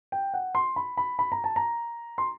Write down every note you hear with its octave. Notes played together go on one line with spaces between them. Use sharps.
G5
F#5
C6
B5
B5
B5
A#5
A5
A#5
C6